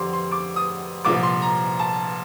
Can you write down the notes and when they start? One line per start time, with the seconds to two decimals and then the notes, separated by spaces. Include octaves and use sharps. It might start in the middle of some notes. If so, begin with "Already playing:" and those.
Already playing: F2 D3 G3 C6 D6
0.13 C6
0.32 D6
0.56 D#6
1.05 C2 A#2 F3 D6
1.23 C6
1.42 A#5
1.79 A5